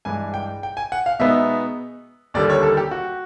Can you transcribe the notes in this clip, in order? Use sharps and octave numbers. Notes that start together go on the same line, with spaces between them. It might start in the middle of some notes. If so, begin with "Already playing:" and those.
G2 E3 G#3 G#5
G5
G5
G#5
F#5
F5
B2 G#3 B3 D#4 E5
D#2 D3 G3 A#3 D5
C#5
A4
G4
F#4